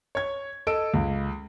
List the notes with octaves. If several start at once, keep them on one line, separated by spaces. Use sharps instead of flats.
C#5 G#6
A4 D#5 E6 D7
C#2